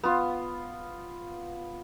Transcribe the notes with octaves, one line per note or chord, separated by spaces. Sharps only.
B3 F4